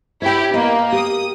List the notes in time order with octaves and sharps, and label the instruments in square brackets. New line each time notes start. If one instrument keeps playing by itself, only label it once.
[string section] E4 G4 [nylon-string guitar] C#5 G5
[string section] A#3 [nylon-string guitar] B3 D#5
[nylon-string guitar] G4 [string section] D#6